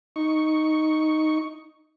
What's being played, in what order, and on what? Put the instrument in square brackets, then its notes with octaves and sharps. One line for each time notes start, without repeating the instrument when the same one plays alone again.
[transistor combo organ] D#4 C#6